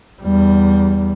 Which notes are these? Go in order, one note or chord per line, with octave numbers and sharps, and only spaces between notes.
E2 G3